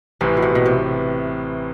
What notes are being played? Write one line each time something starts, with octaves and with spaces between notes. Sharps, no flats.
A1 A2 C3 E3
B2
C3
B2
C3